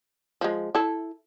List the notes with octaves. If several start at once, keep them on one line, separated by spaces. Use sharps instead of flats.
F3 G#3
E4 A4